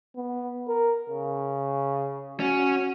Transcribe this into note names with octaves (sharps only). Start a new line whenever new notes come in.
B3
A#4
C#3
C#4 F#4